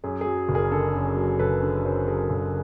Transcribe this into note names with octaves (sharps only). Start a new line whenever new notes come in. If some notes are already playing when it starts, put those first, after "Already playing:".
F#2 G#4
G#4
F#3
F#1
G#4 A#4
D3 A4
F#2
F#3
F#1 A4 B4
D3
F#2 A#4 C5
F#3 G#4 A#4
F#1 A4